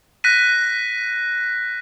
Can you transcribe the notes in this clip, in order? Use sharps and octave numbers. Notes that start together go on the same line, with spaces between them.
F#6 A#6 B6 D#7